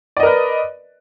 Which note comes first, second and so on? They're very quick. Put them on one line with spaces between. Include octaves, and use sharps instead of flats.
D5 D#5 A#4 B4